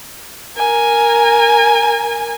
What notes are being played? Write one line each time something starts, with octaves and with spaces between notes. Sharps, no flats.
A#4 G#5